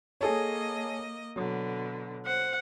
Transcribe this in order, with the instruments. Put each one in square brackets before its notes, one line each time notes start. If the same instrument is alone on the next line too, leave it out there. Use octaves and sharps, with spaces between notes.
[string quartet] A#3 D#5 [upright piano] G#4 A4 C#5
[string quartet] B2 D3 [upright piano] F#3
[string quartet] C5 [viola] F#5